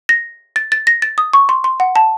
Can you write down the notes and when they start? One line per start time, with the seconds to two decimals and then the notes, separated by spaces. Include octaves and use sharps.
0.09 A#6
0.56 A6
0.72 A6
0.87 A#6
1.02 A6
1.18 D#6
1.33 C#6
1.49 C6
1.64 C6
1.80 F#5
1.96 A5